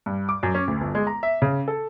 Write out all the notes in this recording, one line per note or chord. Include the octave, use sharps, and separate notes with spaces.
G2
D6
F#2
C#4
D2
G1
G#3
A#5
E5
C#3
A4